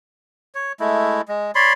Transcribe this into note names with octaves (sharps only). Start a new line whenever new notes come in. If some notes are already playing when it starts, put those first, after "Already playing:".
C#5
G#3 A3 E4
G#3
C#5 D5 B5 C6